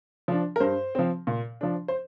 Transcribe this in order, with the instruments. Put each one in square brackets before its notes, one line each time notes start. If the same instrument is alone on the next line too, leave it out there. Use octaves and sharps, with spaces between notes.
[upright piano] F3 D4
A#4
G2 C5
F3 C4
A#2
F3 D4
C5